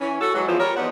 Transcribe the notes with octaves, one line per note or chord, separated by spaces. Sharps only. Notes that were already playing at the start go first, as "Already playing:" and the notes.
E3 C#4
F#4 A4
E3 F#3 G#3
E2 F3
G3 A#4 C#5
E2 F3 B3 D#4 C5 F#5